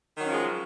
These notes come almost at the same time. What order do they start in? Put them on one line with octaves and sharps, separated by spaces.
D#3 F#3 C#4 F3 G#3